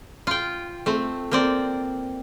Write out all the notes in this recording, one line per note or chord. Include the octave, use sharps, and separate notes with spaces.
F4 G5
A3 C4
A#3 C4 D5